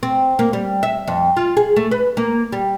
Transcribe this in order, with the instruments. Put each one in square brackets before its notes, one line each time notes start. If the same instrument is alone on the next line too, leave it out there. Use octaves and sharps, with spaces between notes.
[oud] C4
A#3
G3
E5
F2
F4
G#4
A3
B4
A#3
G3